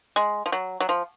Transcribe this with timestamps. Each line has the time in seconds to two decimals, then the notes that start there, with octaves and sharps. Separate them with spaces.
0.16 G#3
0.46 F3
0.52 F#3
0.81 F#3
0.89 F3